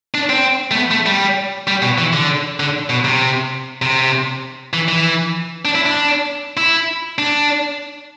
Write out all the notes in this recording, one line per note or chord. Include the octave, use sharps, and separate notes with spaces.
D4
C4
A3
B3
A3
G3
G3
B2
E3
D3
D3
B2
C3
C3
E3
E3
D4
E4
D4
E4
D4